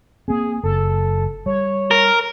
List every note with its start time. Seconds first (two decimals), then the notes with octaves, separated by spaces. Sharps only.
0.28 A#3 C4 G#4
0.63 F#1 A4
1.46 G3 C#5
1.91 A#4